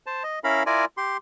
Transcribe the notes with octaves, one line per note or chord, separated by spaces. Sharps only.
C5 A5
D#5
C#4 E4 A#4 F5 B5
E4 F4 A#4 D5 G#5
G4 C6